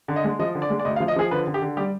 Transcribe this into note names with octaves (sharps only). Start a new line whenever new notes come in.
D3
D#5
G#3
F3 D#5
D3
D5
G#3
D5
D2 D#5
F5
F3
D#5
F3 G#4
D3 B4
D3
G4
D3
G3 G4